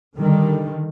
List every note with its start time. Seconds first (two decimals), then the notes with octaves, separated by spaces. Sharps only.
0.16 D3 D#3 G3